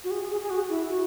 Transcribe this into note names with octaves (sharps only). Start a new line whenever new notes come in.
F#4
G#4
G#4
G#4
F#4
E4
F#4